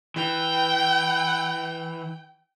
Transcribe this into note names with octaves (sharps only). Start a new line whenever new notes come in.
E3 G5